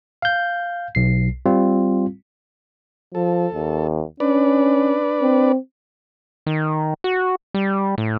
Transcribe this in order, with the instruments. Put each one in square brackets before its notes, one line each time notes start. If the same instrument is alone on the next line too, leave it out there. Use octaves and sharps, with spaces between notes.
[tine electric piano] F5 G6
B1 C7
G3 C4 F4
[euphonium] F3 [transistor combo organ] A4
[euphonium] D#2
[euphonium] C#4 [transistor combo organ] D4 B4 D5
[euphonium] C4
[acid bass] D#3
F#4
G3
A2